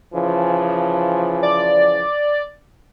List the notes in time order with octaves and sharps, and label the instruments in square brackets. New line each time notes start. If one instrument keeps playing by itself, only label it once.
[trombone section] C#3 E3 F3
[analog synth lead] D5